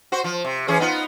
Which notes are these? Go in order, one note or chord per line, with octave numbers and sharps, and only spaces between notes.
F#4 C5
F3
C3
E3 C#4 G#4
B3 D#4 F4